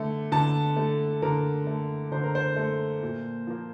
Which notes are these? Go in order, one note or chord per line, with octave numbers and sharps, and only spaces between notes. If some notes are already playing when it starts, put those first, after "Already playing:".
Already playing: D3 A3
D3 A5
A3
D3 A#4
A3
D3 C5
A#4
C5
A3
A#2
F3 A#3